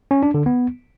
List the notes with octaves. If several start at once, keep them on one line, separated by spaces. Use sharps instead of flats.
C#4
D4
D3
B3